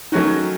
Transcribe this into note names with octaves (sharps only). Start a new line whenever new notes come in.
D#3 F#3 A3 C#4 D#4 F#4